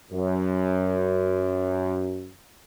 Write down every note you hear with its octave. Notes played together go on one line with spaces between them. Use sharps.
F#2